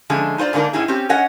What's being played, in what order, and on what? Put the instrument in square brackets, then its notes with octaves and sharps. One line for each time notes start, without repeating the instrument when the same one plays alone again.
[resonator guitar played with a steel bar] D3 F3 G#3 A3 C#4
D#4 F4 C5 D5
G#2 D3 A#3 D4 D#4
A2 C#4 D#4 E4 G#4
C4 C#4 G4
C#4 C#5 D#5 F#5